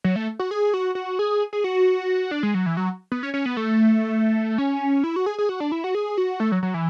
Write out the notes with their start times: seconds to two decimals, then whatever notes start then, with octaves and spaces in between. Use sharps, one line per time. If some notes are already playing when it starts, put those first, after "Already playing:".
0.04 F#3
0.16 A3
0.39 F#4
0.51 G#4
0.74 F#4
0.95 F#4
1.19 G#4
1.53 G#4
1.64 F#4
2.31 D4
2.43 G#3
2.54 F#3
2.66 E3
2.77 F#3
3.12 B3
3.23 C#4
3.34 C#4
3.46 B3
3.57 A3
4.58 C#4
5.04 E4
5.16 F#4
5.26 G#4
5.39 G#4
5.49 F#4
5.60 D4
5.72 E4
5.84 F#4
5.95 G#4
6.18 F#4
6.40 A3
6.52 F#3
6.63 F#3
6.74 E3